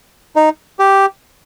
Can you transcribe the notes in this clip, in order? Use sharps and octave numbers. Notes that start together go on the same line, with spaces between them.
D#4
G4